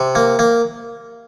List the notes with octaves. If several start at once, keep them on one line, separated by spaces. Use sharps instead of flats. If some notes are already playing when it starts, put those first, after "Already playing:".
Already playing: C3
A#3
A#3